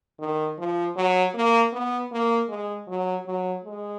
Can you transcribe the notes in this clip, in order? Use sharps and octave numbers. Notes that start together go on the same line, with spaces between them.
D#3
F3
F#3
A#3
B3
A#3
G#3
F#3
F#3
G#3